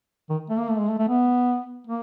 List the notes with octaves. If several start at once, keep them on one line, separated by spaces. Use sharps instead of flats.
D#3
A3
A#3
A3
G#3
A3
A3
B3
A#3